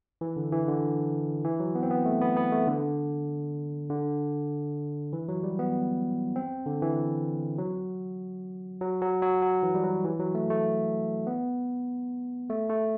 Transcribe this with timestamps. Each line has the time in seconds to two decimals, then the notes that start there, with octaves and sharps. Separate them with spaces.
0.21 E3
0.37 D3
0.52 E3
0.68 D3
1.44 E3
1.60 F#3
1.75 B3
1.83 C4
1.90 B3
2.05 A3
2.21 B3
2.37 B3
2.52 A3
2.67 D3
3.90 D3
5.13 E3
5.28 F#3
5.43 G3
5.59 B3
6.36 C4
6.66 D3
6.82 E3
7.58 F#3
8.81 F#3
9.02 F#3
9.22 F#3
9.42 F#3
9.63 E3
9.75 G3
9.84 F#3
10.04 E3
10.19 F#3
10.35 A3
10.50 A3
11.27 B3
12.50 A3
12.70 A3